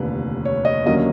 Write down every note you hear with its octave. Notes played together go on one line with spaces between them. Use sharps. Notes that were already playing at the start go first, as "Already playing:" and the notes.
Already playing: F1 D#2 D3 B4
C#5
D#5
D#2 D3 F#3 A#3 C#4 D#5